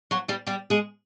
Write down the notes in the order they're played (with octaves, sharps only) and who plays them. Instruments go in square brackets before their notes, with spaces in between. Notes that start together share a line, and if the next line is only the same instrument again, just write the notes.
[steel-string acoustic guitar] F#3 F#4
G3 G4
G3 G4
G#3 G#4